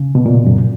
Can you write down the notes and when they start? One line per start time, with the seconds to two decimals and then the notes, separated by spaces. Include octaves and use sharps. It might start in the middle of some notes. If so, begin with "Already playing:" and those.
Already playing: C#3
0.15 B2
0.26 A#2
0.46 F#2